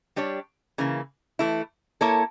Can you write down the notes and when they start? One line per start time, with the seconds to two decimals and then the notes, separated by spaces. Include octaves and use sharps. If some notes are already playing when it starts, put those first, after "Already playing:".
0.16 G3 D4 G4 C#5
0.78 C#3 E3 A#3
1.39 E3 A3 E4
2.01 A#3 E4 A4 C#5